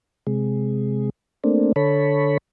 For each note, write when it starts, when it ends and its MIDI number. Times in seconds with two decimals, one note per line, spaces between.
0.27 1.10 48
0.27 1.10 56
1.44 1.72 57
1.44 1.72 58
1.44 1.72 60
1.44 1.72 62
1.76 2.38 50
1.76 2.38 69
1.76 2.38 73
1.76 2.38 83